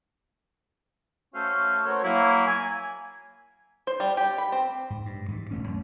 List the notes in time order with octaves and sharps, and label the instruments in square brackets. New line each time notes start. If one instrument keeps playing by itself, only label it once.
[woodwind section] A3 C#4 F#4 A4 C5 F5
F#4 A#4 C5 C#5
F#3 A#3 E4
G#5
[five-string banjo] C5
G3
G4
B5
C4
[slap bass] G#2
G2
G#2 E3
E1 A3 C#4
F#2